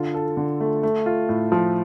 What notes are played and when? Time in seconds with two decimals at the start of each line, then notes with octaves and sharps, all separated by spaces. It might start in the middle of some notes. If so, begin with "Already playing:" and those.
Already playing: D3 F4
0.14 A4
0.37 D3
0.60 A3
0.83 A3
1.06 F4
1.29 A2
1.52 F3